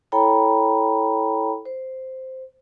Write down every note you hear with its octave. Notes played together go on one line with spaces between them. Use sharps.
E4 A4 C#5 G5 A#5 B5
C5